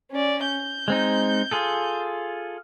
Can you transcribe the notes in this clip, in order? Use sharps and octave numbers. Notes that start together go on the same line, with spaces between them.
C#4 D5
G6
G#3 C4 D#4
F4 G#4 A4